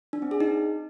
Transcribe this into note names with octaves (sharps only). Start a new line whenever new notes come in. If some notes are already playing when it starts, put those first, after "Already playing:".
D4
C4
G#4
D#4